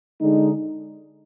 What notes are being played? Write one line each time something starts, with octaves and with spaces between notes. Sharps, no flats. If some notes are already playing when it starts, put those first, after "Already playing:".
D3 G#3 D#4